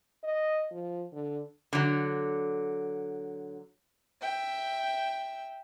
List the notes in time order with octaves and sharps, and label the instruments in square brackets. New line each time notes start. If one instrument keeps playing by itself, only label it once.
[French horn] D#5
F3
D3
[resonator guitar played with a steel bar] D3 F#3
[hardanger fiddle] E5 G5